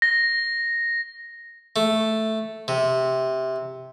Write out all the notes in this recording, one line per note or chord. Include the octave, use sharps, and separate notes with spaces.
A#6
A3
C3